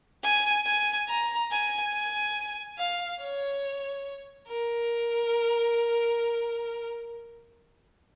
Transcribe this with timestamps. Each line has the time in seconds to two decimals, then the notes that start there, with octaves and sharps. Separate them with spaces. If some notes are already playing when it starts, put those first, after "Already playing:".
0.23 G#5
0.66 G#5
1.08 A#5
1.51 G#5
1.93 G#5
2.78 F5
3.21 C#5
4.48 A#4